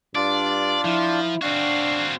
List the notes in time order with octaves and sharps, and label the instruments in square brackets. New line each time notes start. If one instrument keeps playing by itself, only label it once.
[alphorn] G2 [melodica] D4 F4 [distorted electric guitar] D5
[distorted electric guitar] F3 [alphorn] E4
[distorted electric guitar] C4 F#4 [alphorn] D4 [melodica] F5